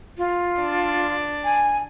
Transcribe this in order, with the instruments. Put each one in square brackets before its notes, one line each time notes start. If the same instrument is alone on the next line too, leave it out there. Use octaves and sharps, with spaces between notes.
[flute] F4
[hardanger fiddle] D4 D5
[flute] G#5